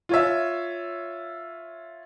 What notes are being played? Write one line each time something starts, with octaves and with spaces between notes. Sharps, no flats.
F4 C#5 E5